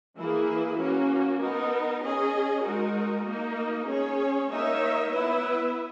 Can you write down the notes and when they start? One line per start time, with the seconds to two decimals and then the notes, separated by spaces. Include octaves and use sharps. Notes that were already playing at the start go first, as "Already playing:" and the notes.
0.18 E3 A#3 E4 G#4 B4
0.80 A#3 C#4 F#4
1.42 B3 D#4 A#4
2.04 C#4 G#4 D#5
2.66 G#3 D#4 F#4 A#4
3.28 A#3 D#4 A#4
3.89 C#4 G#4 C#5
4.52 A#3 D#4 A#4 C#5 E5
5.13 B3 E4 B4 E5